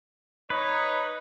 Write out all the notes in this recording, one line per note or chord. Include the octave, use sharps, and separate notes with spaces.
D#4 B4 C#5